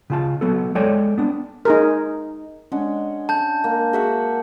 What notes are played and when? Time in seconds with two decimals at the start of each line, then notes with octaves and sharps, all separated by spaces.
0.10 C#3 F4 A5
0.41 F#3 B3 A4
0.75 G#3 A4 C#5 D5 G5 G#5
1.18 B3 D4
1.65 D#4 G#4 A#4
2.72 G#3 C#4 D4 F#5
3.29 A5 G6
3.64 A#3
3.93 F#4 G#4 E5 F#5